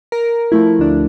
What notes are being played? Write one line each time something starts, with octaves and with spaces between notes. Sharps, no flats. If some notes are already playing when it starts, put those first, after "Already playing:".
A#4
F3 A3 E4
D2 D4